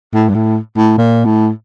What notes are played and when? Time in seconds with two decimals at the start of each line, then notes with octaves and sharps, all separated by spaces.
0.14 A2
0.29 G2
0.35 A2
0.77 A2
0.98 A#2
1.25 A2